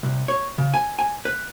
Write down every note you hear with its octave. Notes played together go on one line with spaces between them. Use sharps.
C2
C#5
C#3
G#5
G#5
B4